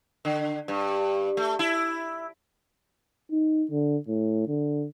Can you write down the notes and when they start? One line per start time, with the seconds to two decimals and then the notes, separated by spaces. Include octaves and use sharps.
0.25 D3
0.68 G2
1.37 A3
1.59 E4
3.31 D#4
3.71 D3
4.08 A2
4.48 D3